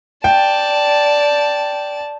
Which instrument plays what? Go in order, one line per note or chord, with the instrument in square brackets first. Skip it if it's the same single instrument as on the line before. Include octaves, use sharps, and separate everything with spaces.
[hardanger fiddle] D5 A5 [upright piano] G5